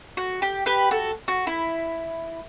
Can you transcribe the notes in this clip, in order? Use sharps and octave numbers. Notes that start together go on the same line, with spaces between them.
F#4
G4
G4 B4
F#4 A4
F#4
E4